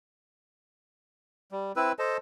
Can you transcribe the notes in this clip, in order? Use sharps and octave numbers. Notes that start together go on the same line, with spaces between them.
G3
C4 E4 B4 E6
A4 C5 D#5 A5